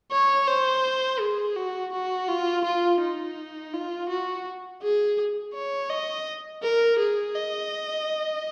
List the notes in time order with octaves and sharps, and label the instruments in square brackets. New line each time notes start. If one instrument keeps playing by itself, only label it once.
[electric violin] C#5
C5
G#4
F#4
F#4
F4
F4
D#4
F4
F#4
G#4
C#5
D#5
A#4
G#4
D#5